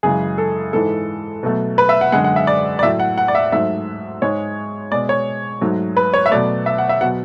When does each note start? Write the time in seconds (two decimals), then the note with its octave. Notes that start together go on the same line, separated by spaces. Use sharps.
0.03 F#2 C#3 E3 G#3 G#4
0.38 A4
0.73 G#2 E3 G#3 A4
1.43 B2 F#3 A3
1.78 B4
1.89 E5
2.01 F#5
2.12 F#2 D3 G#3 F#5
2.24 F#5
2.36 E5
2.47 D5
2.79 D5
2.83 A2 F#3 A3 E5
3.00 F#5
3.18 F#5
3.28 D5
3.35 E5
3.52 G#2 F#3 A3 E5
4.22 G#2 G#3 C#5
4.92 B2 G#3 D5
5.09 C#5
5.61 G#2 F#3 A3
5.97 B4
6.14 C#5
6.26 E5
6.31 B2 F#3 A3 D5
6.66 E5
6.78 F#5
6.89 E5
7.01 B2 F#3 F#5